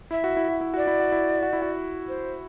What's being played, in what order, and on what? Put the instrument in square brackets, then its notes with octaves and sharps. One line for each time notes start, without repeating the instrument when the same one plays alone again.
[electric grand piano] E4 [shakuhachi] E5
[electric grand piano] F#4
E4
F#4
E4
[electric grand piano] F#4 [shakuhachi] D5
[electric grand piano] E4
F#4
E4
F#4
E4
F#4
[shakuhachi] C5